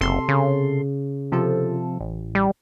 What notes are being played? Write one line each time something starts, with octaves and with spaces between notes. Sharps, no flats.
F#1 C3 A4 C6
C#3
C3 F3 A4
A1
G3